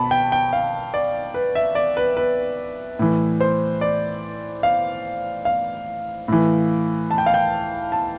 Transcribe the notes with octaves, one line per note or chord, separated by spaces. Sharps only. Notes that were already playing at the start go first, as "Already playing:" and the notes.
Already playing: B2 A5 B5
G5
G5
F5
D5
B4
E5
D5
B4
B4
A2 E3
C5
D5
F5
F5
A2 E3
A5
G5
F5
G5
A5